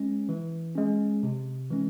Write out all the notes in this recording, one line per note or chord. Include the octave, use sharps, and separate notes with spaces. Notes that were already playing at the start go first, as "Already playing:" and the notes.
Already playing: G#3 C#4
E3
G#3 C#4
C3
E3 G#3 C#4